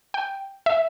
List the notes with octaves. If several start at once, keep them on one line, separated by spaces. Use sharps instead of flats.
G5
E5